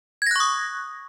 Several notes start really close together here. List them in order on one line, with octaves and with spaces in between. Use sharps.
G#6 A#6 F#6 C#6 D#6